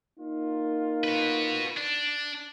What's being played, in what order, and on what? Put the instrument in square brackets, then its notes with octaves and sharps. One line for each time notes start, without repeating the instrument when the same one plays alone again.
[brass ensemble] A#3 D#4 F4
[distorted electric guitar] F#4 B4
D4